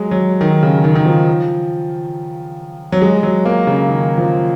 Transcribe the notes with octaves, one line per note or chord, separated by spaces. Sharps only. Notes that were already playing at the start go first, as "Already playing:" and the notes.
Already playing: F#3 G#3
F#3
D#3
C#3
D#3
D#3
F3
F#3
G#3
F#3
A#3
C#3
D#3
F3